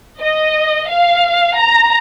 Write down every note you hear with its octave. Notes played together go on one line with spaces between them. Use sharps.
D#5
F5
A#5